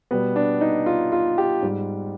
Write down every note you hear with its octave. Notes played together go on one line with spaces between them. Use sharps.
B2 G3 B3
D4
D#4
F4
F4
G4
G#2 G3